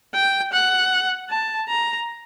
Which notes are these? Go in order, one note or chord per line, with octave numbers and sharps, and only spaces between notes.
G5
F#5
A5
A#5